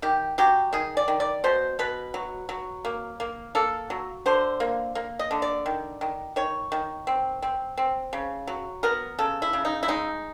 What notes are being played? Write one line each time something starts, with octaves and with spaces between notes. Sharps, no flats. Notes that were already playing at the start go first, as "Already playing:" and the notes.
D#3 G4
F#3 G4
D#3 G#4
D5
D#3
D5
B2 C5
B2 B4
F#3
F#3
A#3
A#3
A#3 A4
F#3
D3 C5
A#3
A#3
D#5
D3
D5
D#3
D#3
D#3 C#5
D#3
C4
C4
C4
C#3
F#3
B3 A#4
C#3 A4
E4
C#3
D#4
E4
G#3 D#4